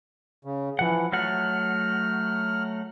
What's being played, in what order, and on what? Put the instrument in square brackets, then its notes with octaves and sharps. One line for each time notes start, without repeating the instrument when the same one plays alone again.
[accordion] C#3
[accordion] E3 [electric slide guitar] F3 F#5
[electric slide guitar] F#3 A3 F#5 [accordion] F6